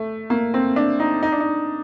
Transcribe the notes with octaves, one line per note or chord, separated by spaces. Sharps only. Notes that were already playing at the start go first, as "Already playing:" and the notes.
Already playing: A3
A#3
C4
D4
D#4
D#4
D4
D#4